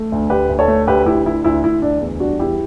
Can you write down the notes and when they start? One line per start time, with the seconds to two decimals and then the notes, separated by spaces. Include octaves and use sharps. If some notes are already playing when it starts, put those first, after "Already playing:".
Already playing: A3
0.12 D2
0.30 D2 G4 B4
0.49 D2
0.59 A4 C#5
0.68 A3
0.87 D2 G4 B4
1.06 D2 E4 G4
1.26 D2 E4
1.44 D2 E4
1.64 D2 E4
1.82 D2 D4
2.01 E2
2.20 G3 D4 F#4
2.39 E2 E4 G4